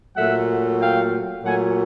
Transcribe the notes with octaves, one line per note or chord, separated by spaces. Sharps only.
A#2 F#3 A3 E5 F#5
F5 G5
A#2 F#3 A3 F#5 G#5